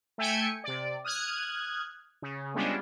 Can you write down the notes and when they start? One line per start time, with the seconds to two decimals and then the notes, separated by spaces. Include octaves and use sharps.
0.18 A3 E5 G5 G#5 C#7
0.64 C3 D5
1.05 D#6 F6 F#6 G#6
2.22 C#3
2.55 G3 G#3 B3 C#4 D4 F4